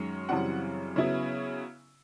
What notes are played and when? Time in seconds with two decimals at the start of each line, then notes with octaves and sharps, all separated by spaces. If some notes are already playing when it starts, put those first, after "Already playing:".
Already playing: F#2 D#3 G#3 C#4
0.29 F#2 C#3 E3 G3 C4 F#5
0.96 C#3 F#3 B3 E4